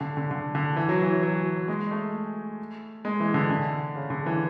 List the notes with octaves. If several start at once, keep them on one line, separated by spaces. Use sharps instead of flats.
D3
D3
D3
D3
E3
F#3
E3
F#3
G#3
A3
G#3
E3
D3
D3
C#3
D3
E3